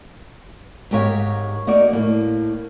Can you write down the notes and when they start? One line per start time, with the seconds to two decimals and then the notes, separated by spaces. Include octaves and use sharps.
0.91 G#2 G4 A#4 C#5 F5
1.67 A#3 D#4 F#4 D5
1.93 A2 A#3